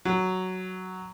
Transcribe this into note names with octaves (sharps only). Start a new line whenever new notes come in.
F#3